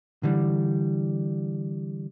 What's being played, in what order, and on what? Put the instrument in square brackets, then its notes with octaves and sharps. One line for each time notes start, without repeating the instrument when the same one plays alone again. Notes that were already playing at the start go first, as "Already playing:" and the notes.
[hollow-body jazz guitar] D3 E3 G3